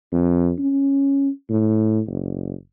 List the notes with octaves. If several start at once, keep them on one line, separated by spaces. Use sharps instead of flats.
F2
C#4
A2
F#1